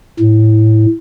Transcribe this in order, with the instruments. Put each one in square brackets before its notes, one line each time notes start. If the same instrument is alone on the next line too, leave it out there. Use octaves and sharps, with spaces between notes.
[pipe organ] A2